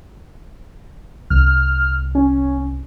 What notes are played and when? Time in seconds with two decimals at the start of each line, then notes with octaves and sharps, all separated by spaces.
1.30 C2 F6
2.15 C#4